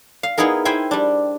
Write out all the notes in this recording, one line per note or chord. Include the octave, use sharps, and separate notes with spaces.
F5
B3 D#4 E4 G#4 A#4
E4 C5 E5 G5 G#5
G3 D4